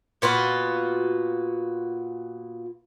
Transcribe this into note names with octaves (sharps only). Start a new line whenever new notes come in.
A#2 B3 F4 F#4